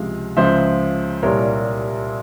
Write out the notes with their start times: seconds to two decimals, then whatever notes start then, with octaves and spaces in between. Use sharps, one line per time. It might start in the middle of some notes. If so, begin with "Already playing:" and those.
Already playing: C#2 C3 F3 G#3 F5
0.37 C#2 C#3 F3 G#3 C5 E5
1.23 C2 A#2 G3 A#4 C#5